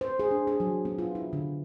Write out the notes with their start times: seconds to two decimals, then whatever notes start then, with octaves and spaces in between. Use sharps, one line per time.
0.01 C5
0.20 G#4
0.31 D4
0.47 G#4
0.60 F#3
0.85 B3
0.98 F4
1.15 E4
1.33 D3